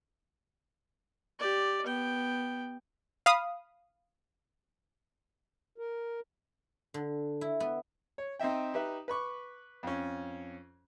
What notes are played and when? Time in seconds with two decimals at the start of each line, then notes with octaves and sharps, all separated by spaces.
1.40 G4 D5
1.86 B3 G5
3.26 F5 B5 D#6
5.78 A#4
6.94 D3
7.41 E4
7.60 B3
8.18 C#5
8.39 C4 D#4 D#5 E5 G5
8.74 D#4 G4 B4 E5
9.08 B4 B5 C#6 D6
9.83 F2 C#4